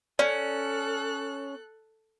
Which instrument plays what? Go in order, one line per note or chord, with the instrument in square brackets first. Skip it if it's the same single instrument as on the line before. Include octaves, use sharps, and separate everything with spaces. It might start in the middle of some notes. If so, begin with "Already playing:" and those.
[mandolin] C#4 [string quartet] A4 F#6 [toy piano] D5